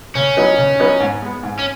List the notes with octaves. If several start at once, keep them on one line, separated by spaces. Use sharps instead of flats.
C#3 C#4
F#3 D#4 B4 D#5
C#3
F#3 D#4 B4 D#5
G#2
G#3 B3
G#2
C#4